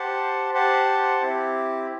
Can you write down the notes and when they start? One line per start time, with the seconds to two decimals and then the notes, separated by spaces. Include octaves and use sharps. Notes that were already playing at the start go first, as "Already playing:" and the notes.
Already playing: G4 C5 F#5 A5
0.53 G4 C5 F#5 A5
1.21 C4 E4 G4